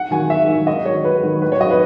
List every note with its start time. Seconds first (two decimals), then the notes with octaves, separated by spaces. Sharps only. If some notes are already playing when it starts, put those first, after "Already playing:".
Already playing: F#5
0.11 D#3 F#3 G#5
0.30 G#2 E5
0.49 D#3 F#3
0.67 G#2 D#5
0.85 D#3 F#3 C#5
1.04 G#2 B4
1.23 D#3 F#3
1.42 A2 B4
1.52 C#5
1.61 F#3 D#5
1.70 B4